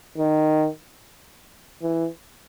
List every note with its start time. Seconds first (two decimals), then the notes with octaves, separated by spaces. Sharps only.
0.18 D#3
1.82 E3